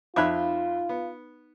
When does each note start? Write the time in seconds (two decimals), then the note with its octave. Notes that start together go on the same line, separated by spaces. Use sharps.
0.16 F2 D#4 F4 E5 B5 D6 F#6
0.89 B3